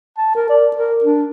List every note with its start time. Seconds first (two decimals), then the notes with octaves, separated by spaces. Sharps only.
0.17 A5
0.35 A#4
0.49 D5
0.76 A#4
1.04 D4